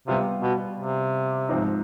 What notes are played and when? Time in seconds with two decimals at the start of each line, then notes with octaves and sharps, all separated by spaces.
0.07 C3 G3 B3 F4
0.43 B2
0.77 C3
1.49 G#2 F3 C4 D#4